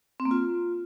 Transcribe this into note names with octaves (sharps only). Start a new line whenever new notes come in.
C4
A#3
F4